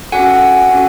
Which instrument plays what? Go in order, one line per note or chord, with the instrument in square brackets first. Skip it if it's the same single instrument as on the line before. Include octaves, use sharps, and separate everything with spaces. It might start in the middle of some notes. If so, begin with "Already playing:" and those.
[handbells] C#4 F#4 A4 F#5 G#5
C#4 F#4 A4